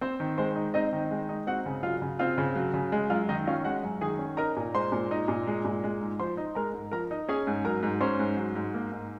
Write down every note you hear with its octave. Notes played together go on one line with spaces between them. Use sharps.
C4 C5
D#3
G#3 C5
D#4
C4 D#4 D#5
D#3
G#3
D#4
C4 F#4 F#5
C#3
F#3 F4 F5
C#3
C4 F4 F5
C#3
F#3
C#3
G#3
F#2 F4 F5
D#3 D#4 D#5
C#4 F4 F5
G#3 F#4 F#5
F#2
D#3 G#4 G#5
C#4
D#4 A#4 A#5
A#2
G#3 C5 C6
A#2
D#4
A#2
G#3
A#2
G#3
G#2
F3 C5 C6
D#4
G#3 A#4 A#5
G#2
F3 A#4 A#5
D#4
C#4 G#4 G#5
G#2
F#3 A#4 A#5
G#2
C#4 C5 C6
G#2
F#3
G#2
A#3
G#2